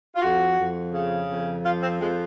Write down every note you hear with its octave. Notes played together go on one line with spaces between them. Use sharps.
F4
F2 F#4
F2
C#3
F2
F3 F4
C4
F2 G#3